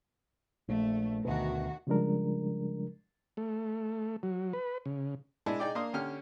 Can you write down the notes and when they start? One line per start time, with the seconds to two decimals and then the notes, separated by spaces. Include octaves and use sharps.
0.68 A#1 A3
1.25 D2 B2 D#3 F#4
1.87 C#3 F3 G3 G#3 D4 A#4
3.37 A3
4.23 F#3
4.53 B4
4.86 C#3
5.46 G#3 D4 E4 G#4 A5
5.60 D#4 G#4 D5 G5 D6
5.75 A#3 D4 F5 C6 D#6
5.94 D3 C#4 G4 F6